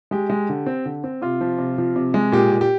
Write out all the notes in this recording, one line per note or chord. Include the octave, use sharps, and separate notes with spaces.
G#3 G4
G#3
D3
C4
D3
C4
C3 F4
F3
C3
F3
C3
G#3
A#2 G4
A#2
G4